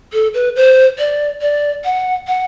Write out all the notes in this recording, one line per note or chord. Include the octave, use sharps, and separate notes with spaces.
A4
B4
C5
D5
D5
F#5
F#5